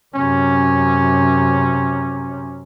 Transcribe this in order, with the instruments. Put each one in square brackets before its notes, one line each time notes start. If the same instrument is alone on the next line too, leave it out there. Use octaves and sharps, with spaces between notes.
[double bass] F#2 C3 [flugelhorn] C#4